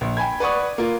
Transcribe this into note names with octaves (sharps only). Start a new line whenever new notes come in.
A#1
G5 G#5 B5 G#6
B4 D5 F#5 C#6 D#6
A#3 F4